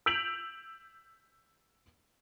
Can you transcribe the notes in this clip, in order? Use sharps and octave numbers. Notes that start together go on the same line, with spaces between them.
E6 G6 B6 D7 F7 F#7